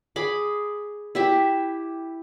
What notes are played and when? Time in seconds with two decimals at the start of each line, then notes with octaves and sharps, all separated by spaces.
0.16 G#4 B5 D6
1.15 E4 G4 E5